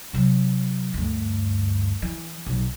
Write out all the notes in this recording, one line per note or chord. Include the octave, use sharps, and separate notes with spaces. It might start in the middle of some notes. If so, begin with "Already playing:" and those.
C3 F#3
D2 G2
E3
B1